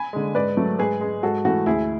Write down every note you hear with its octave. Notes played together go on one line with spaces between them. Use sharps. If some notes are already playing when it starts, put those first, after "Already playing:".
Already playing: G#5 B5
D3 G#3
G#2 B4 D5
F#3 A3
G#2 G#4 B4
G#3
G#2 F#4 A4
E3 A3 F#4
D2 E4 G#4